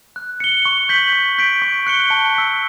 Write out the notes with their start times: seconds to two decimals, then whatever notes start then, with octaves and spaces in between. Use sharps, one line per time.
0.16 F#6
0.40 C#7 G7
0.65 C#6
0.89 G6 B6 F#7
1.13 C#6
1.38 G6 B6 D7
1.62 C#6
1.87 F#6 C#7 G7
2.10 A5
2.35 E6 B6